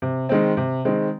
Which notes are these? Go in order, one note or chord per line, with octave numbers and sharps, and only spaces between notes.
C3
D#3 G#3 C4
C3
D#3 G#3 C4